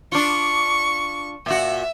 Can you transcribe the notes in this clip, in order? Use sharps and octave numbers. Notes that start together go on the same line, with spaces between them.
D4 F4 C#6
A#2 F#4 E5